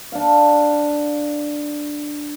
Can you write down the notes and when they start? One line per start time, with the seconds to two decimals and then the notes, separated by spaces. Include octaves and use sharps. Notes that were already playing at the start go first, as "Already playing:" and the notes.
0.12 D4 F5